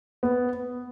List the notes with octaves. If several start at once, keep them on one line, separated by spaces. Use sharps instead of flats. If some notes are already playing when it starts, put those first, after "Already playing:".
B3